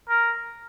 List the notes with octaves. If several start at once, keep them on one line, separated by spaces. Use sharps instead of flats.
A#4